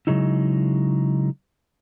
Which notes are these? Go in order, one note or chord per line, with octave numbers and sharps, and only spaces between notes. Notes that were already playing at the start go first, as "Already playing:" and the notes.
C#3 F#3 G#3 D#4 E4